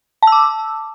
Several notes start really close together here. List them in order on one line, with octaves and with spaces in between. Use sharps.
A5 E6 D6